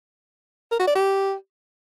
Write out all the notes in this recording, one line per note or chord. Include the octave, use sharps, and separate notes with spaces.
A#4
F#4
D5
G4